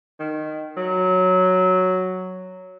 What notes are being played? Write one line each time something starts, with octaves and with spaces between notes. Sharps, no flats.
D#3
F#3